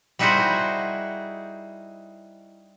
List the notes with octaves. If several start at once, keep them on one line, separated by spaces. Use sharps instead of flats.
G3 D#4 E4 F#4 G#4 C5